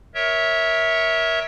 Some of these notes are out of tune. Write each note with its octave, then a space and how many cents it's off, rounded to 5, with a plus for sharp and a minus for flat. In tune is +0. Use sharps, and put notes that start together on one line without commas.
A#4 +20 C#5 +0 E5 -15